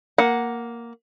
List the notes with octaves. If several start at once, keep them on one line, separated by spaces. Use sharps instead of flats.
A#3 F#5